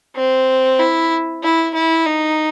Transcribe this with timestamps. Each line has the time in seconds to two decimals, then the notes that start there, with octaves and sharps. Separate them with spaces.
0.16 C4
0.79 E4
1.43 E4
1.74 E4
2.06 D#4